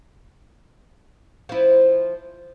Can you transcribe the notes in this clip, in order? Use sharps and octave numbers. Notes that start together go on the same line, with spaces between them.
F3 E4